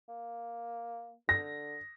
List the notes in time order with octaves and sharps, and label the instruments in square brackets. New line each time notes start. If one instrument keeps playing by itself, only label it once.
[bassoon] A#3
[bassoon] D3 [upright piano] A#6